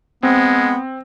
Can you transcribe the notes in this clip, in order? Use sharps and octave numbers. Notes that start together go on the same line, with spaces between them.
G#3 B3 C4